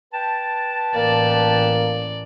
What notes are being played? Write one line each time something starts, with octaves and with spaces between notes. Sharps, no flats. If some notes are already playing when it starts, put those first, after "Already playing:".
B4 G5 A5
A1 A#3 D5